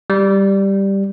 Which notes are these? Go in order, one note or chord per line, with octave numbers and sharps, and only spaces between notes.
G3